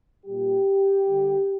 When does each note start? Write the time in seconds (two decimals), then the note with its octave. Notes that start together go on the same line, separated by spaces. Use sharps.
0.25 A#2 G3 G4
1.06 D3 G3